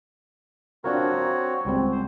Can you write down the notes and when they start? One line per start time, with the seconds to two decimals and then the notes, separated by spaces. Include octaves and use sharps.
0.84 C4 D4 F4 F#4 A#4 C#5
1.14 A#5
1.65 C#2 G3 C4
1.92 C5